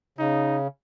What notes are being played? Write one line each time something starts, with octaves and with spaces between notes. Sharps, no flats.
C#3 D#4